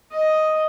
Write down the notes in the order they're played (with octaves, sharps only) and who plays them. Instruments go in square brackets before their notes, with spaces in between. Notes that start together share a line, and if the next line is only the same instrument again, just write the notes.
[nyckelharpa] D#5